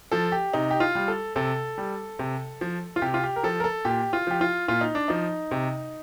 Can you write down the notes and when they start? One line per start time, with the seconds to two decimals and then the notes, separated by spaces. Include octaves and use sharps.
0.12 F3 A4
0.32 G4
0.53 C3 D#4
0.71 G4
0.80 F4
0.95 G3
1.08 A4
1.36 C3 A4
1.78 G3
2.19 C3
2.61 F3
2.96 F4
3.02 C3 G4
3.14 F4
3.24 G4
3.36 A#4
3.43 F3 A4
3.60 A#4
3.64 A4
3.85 A#2 G4
4.13 F4
4.27 F3 G4
4.41 F4
4.68 A#2 F4
4.81 D#4
4.95 D4
5.08 F3 D#4
5.51 C3